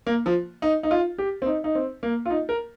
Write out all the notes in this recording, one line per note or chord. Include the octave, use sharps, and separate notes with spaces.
A#3
F3
D#4
D#4
F4
G4
C4
D#4
D#4
C4
A#3
F4
D#4
A#4